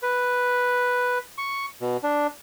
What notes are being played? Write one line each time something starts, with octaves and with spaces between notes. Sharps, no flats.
B4
C#6
B2
D4